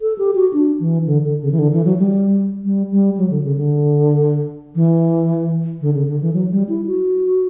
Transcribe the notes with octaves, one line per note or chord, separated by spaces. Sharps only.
A4
G4
F#4
D4
E3
D3
D3
C#3
E3
D3
E3
F#3
G3
G3
G3
F#3
D3
C#3
D3
E3
D3
C#3
D3
E3
F#3
G3
E4
F#4